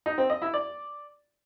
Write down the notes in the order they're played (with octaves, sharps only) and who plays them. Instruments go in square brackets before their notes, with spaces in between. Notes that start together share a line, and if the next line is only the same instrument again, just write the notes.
[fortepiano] D#4
C4
D#5
E4
D5